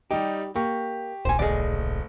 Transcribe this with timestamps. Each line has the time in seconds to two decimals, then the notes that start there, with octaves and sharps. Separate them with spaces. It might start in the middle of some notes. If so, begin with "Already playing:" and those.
0.11 G3 D#4 G4
0.56 A#3 G4 C#6
1.25 D1 A#1 C5 G#5
1.39 F#1 A3 G#4 D5 D#5